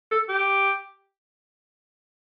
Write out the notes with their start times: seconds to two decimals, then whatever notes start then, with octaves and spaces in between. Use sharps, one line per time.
0.11 A4
0.29 G4